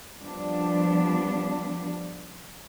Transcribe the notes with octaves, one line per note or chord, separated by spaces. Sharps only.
F3 G3 B3 D4